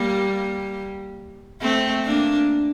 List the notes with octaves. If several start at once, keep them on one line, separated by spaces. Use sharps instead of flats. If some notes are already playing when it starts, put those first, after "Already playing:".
Already playing: G3 A#3
A3 C4
A#3 D4